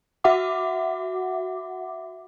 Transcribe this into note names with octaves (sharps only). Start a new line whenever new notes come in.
F#4 E5 F#5 D6